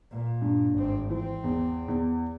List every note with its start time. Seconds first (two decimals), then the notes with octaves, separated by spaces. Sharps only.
0.11 A#2
0.42 G2
0.76 G#1 C4
1.10 E3 C4
1.44 E2
1.88 E2